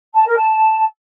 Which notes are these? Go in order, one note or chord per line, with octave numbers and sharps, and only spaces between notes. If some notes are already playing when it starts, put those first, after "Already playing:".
A5
A#4
A5